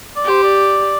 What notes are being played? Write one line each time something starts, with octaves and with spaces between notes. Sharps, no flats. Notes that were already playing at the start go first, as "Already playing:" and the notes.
D5
G4 C5
D5